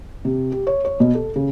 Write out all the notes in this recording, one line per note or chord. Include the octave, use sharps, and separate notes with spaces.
C3
G4
C#5
C#5
B2
A4
C#3